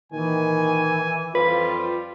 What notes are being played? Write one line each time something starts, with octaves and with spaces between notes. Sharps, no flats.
A#2 D#3 E3 G#5
F2 F3 G3 F4 B4